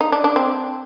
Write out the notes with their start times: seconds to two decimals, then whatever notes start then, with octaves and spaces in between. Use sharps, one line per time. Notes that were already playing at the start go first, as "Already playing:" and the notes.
0.01 D#4
0.12 D4
0.24 D4
0.36 C4